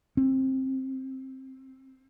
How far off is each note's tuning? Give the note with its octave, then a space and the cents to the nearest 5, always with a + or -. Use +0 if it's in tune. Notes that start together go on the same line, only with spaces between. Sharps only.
C4 +15